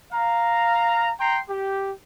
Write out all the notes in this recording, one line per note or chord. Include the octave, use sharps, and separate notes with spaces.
F5 A#5
G5 A#5 C6
G4